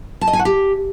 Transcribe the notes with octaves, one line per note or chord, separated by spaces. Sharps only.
A5
D#5
G#5
F#4
G4